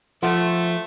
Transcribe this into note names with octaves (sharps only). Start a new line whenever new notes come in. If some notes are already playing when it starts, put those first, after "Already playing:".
F3 A3 F#5 C6